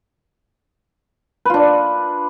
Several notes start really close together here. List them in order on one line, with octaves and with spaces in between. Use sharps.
B4 F4 D4